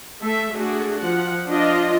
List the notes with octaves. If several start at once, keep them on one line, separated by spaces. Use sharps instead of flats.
A3 A4 E5
A3 D4 F#4 G#4
F3 F#5
F3 D4 F4 D#5